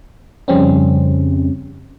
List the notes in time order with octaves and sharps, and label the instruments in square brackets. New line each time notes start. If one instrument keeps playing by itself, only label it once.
[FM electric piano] F2 C#3 G3 C4 C#4